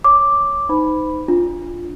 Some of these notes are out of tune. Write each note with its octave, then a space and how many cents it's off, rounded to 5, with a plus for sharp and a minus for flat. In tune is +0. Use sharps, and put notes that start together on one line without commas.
C#5 +0 D6 +0
D#4 +0 C5 -35 B5 +0
D4 +0 F4 +0